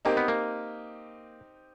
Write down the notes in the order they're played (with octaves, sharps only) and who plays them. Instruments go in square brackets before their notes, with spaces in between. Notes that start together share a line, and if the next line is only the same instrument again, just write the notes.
[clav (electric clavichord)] A#3 [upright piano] C4 D#4 G4 A#4
[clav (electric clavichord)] B3
A#3